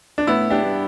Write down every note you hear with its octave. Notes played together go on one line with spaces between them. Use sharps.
D4
A2 B3 E4
D4 G4
G2